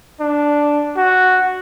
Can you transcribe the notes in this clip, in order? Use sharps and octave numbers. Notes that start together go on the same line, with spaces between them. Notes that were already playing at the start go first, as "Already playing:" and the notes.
D4
F#4